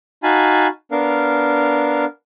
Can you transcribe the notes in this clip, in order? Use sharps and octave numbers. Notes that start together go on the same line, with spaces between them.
D#4 F#4 F5 G#5 A5 B5
B3 D4 A#4 F5